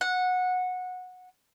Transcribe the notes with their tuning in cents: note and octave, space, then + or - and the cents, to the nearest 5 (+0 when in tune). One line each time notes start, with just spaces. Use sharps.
F#5 -15